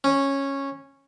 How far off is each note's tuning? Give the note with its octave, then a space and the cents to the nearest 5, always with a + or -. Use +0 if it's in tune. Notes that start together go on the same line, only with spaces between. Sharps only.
C#4 -10